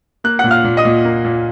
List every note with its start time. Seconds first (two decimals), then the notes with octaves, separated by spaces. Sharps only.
0.24 A#3 F#6
0.39 A#2 F#5 F#6
0.51 F5 F6
0.64 A#2
0.77 D#5 D#6
0.85 A#2
1.05 A#3
1.24 A#2